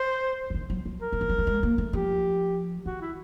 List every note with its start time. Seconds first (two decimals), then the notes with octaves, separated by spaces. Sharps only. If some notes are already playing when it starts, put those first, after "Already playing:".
Already playing: C5
0.50 D3
0.54 D#3
0.70 F#3
0.86 F#3
1.01 A#4
1.12 E3
1.21 F3
1.29 F#3
1.38 G3
1.47 G#3
1.63 A#3
1.78 A3
1.93 F3 G4
2.86 D#3 F#4
3.01 E4